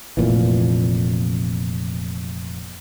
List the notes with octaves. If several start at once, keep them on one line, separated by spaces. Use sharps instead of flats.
F1 A#2 E3